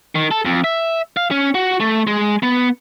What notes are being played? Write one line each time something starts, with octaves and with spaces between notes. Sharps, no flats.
D#3
A4
F2
E5
F5
C#4
F#4
A3
G#3
B3